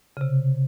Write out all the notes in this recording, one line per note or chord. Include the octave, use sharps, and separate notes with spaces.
C#3
C3